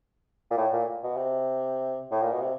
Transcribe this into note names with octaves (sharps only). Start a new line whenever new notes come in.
A#2
A2
A#2
B2
C3
A2
A#2
B2
C3